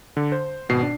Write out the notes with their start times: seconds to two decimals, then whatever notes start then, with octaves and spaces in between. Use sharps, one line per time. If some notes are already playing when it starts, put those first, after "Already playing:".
0.17 D3
0.32 C5
0.69 G#1 B2 C7
0.82 D4